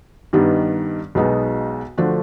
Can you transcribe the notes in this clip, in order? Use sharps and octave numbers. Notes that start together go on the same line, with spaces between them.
G2 D#3 G3 B3 D#4
B1 B2 G#3 B3 D#4
D3 F3 A3 D4 F#4